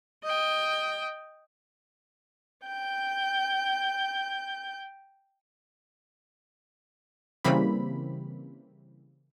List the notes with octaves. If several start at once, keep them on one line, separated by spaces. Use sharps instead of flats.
D#5 G5
G5 G6
C#3 E3 G3 A#3 C4 B5